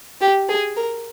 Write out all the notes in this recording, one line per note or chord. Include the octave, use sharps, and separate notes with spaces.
G4
G#4
A#4